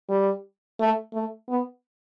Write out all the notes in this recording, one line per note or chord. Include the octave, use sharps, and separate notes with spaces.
G3
A3
A3
B3